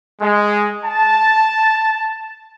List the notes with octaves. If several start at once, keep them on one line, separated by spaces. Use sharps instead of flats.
G#3
A5